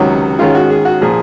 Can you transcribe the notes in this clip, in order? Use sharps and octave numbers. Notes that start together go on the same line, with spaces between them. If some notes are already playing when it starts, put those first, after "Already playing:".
Already playing: C#2 C3 D#3 F#3 C#4 F#4
G#2 D#3 G#3 C#4 F4
F#4
G#4
F#4
A#2 F3 G#4